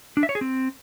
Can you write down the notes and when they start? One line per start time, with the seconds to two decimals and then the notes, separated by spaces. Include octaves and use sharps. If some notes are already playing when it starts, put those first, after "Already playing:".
0.17 D4
0.23 E5
0.29 C#5
0.35 G#4
0.41 C4